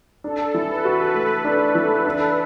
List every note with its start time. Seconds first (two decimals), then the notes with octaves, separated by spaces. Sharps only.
0.24 D4 A4
0.54 E3
0.70 B4
0.85 F#4
1.15 A3
1.45 D4
1.75 E3
2.05 D4